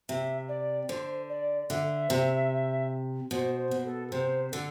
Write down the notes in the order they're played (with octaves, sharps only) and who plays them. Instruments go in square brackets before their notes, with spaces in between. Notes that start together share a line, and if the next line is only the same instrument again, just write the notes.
[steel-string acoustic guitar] C3 [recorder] E5
[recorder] D5
[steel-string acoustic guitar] D3 [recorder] C5
[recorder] D5
[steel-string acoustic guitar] D3 [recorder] E5
[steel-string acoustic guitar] C3
[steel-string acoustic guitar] B2 [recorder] C5
[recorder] C5
[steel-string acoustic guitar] B2
[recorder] A4
[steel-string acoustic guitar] C3 [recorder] C5
[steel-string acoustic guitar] D3 [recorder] A4